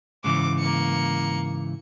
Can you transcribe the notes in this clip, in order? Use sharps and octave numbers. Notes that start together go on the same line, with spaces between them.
G#2 C#3 E3 D6
A#3 C#7